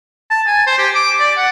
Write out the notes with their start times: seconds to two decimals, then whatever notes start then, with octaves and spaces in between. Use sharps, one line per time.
0.31 A5
0.47 G#5
0.67 C5
0.78 G4
0.95 D6
1.20 D5
1.37 F#5